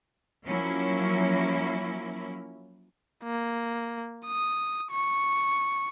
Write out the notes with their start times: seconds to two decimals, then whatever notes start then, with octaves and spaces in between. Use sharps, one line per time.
0.44 F3 F#3 A#3 C#4 E4
3.24 A#3
4.27 D#6
4.91 C#6